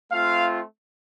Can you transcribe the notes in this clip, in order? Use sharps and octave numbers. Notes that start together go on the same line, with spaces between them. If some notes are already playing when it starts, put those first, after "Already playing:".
A3 C4 F4 F5